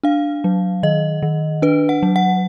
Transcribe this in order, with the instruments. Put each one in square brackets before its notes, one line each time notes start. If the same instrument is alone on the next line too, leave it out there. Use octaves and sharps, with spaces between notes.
[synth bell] D4 F5
F#3
D#3 D#5
D#3
D4 B4
F#5
F#3
F#5